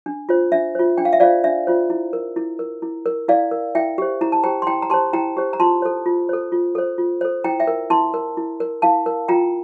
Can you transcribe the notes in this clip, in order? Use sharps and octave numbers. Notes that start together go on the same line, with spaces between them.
D4
F4 C5
D4 E5
F4 C5
D4 G5
F5
E5
F4 C5 D5 F5
D4 E5
F4 C5
E4
A#4
E4
A#4
E4
A#4
E4 D5 F5
A#4
E4 E5 G5
G4 C5
E4 A#5
A5
G4 C5 G5 A#5
C6
E4 G5 A#5
A#5
G4 C5 A5 C6
E4 G5 A#5
G4 C5
A#5
F4 A5 C6
A4 C5
F4
A4 C5
F4
A4 C5
F4
A4 C5
E4 G5 A#5
E5 G5
A#4
E4 A5 C6
A#4
E4
A#4
E4 F5 A5
A#4
F4 G5 A#5